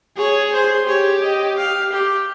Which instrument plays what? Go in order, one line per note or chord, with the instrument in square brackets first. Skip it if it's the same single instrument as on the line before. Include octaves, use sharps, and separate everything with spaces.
[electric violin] G#4 [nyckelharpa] C#5
[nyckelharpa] C5
[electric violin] G4 [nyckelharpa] C#5
[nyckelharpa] D#5
F5
G4